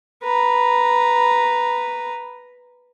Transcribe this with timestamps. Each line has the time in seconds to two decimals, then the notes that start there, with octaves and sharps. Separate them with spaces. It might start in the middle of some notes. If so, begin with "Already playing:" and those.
0.23 B4 A#5